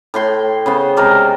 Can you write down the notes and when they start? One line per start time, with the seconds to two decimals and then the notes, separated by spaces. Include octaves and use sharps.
0.14 A2 G5 C6
0.66 C#3 B3 C5
0.97 C3 G#3 A#4 D5